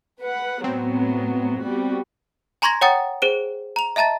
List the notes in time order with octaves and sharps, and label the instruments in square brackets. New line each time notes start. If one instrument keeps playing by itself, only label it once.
[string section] B4 F#5
[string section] A2 F#3 B3 [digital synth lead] C4
[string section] G3 B3 F#4
[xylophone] G#5 A#5 C6 C#6 G#6 A#6
C#5 F#5 G5 A#5 D#6 A6
G#4 C5 D7
A#5 F7
D#5 E5 A5 A#5 A6